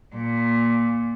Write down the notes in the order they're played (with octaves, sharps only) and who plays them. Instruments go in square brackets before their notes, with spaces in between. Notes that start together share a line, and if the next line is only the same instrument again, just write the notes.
[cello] A#2